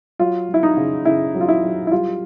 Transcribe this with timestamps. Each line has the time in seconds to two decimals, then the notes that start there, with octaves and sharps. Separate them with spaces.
0.19 F#3 F4
0.49 F#3
0.54 E4
0.63 D#4
0.77 C#3
1.05 C#3 E4
1.34 F#3
1.41 F4
1.49 E4
1.63 F#3
1.87 E4
1.91 G3 F4